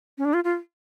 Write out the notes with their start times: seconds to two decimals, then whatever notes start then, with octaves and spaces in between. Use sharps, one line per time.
0.18 C#4
0.25 D4
0.34 F4
0.44 F4